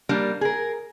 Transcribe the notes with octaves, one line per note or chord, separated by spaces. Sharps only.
G3 A#3 D4
G#4 A#4